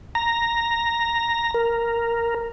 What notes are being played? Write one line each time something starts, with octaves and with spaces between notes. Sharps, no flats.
A#5
A#4